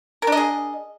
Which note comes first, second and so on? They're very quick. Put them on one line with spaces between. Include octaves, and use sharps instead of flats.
A#4 D4 D#5 G#4